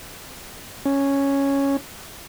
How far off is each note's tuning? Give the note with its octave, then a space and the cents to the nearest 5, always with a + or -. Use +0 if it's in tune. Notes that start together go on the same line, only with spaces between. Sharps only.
C#4 +0